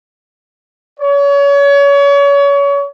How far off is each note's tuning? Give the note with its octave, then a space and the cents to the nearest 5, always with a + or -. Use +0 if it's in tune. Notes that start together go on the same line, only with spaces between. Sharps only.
C#5 +30